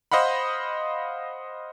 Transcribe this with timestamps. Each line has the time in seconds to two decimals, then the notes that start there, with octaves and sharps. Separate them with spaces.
0.12 C5 D#5 F5 F#5 B5